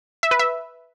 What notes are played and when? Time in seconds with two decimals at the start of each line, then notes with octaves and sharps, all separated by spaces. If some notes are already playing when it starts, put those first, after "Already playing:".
0.23 E5
0.31 B4
0.39 E5